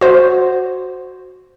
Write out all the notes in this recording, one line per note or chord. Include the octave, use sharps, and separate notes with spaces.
F#4 C5